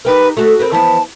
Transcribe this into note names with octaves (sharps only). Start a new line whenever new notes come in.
D#4 G4 A#4 B4
A3 F#4 A4
C4 A#4 B4
E3 F3 B3 A5